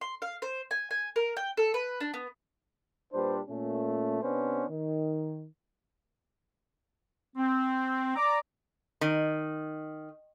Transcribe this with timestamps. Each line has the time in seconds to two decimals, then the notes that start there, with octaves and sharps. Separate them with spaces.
0.01 C6
0.22 F5
0.42 C5
0.71 G#5
0.91 G#5
1.16 A#4
1.37 G5
1.57 A4
1.74 B4
2.01 D4
2.14 B3
3.13 A#2 G3 D4 B4 C5
3.49 A#2 A3 C#4
4.22 C3 B3 C#4 D4 B4 C5
4.70 D#3
7.36 C4
8.16 D5 A#5 D6
9.01 D#3